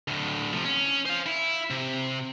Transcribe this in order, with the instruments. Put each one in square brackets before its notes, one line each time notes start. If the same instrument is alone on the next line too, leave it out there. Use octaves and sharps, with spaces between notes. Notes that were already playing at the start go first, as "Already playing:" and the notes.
[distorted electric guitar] D2 A2
C3 F3
C#4
C5 F5
E4
C3